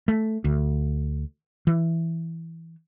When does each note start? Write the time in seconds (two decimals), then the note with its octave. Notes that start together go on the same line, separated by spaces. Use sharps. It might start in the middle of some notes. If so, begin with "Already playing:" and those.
0.08 A3
0.44 D2
1.67 E3